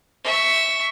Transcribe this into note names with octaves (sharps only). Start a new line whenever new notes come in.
E5 C#6